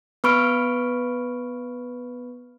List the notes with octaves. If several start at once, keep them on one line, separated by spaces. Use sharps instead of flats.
B3 B4 B5 C#6 F6 D7